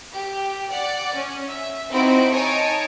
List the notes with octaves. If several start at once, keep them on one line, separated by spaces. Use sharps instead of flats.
G4
D5 F#5
C#4
E5
C4 D#4 E4 F#4 C5 D7
D#4 C#5 G#5 A5 C#6 D7